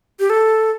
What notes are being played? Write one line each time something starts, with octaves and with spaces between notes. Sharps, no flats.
G4
A4